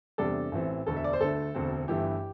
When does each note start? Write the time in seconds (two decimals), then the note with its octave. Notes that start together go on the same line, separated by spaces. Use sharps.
0.18 E2 C3 G3 D4 A4
0.52 A1 A2 E3 C4
0.87 E1 D2 D3 A4
0.97 E5
1.04 D5
1.13 C5
1.20 D2 D3 A3 A4
1.55 E1 D2 D3 C4
1.88 G1 G2 E3 A3 E4 G4